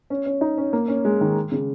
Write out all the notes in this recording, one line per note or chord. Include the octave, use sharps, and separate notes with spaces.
C#4
C#4
D#4
C#4
A#3
C#4
G#3
D#3
C#3